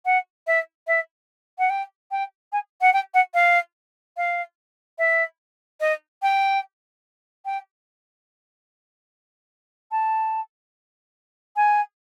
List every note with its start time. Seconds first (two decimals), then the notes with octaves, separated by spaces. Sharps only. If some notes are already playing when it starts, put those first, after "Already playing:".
0.05 F#5
0.47 E5
0.87 E5
1.59 F#5
1.70 G5
2.11 G5
2.52 G#5
2.81 F#5
2.93 G5
3.14 F#5
3.34 F5
4.17 F5
4.98 E5
5.80 D#5
6.22 G5
7.45 G5
9.91 A5
11.56 G#5